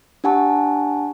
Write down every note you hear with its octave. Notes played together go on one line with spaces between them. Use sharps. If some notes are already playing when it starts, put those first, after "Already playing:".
D4 G4 F#5 G#5 A5 C#6